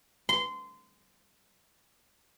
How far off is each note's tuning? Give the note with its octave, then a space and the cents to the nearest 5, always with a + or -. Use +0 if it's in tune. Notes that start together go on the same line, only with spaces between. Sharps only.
C6 -20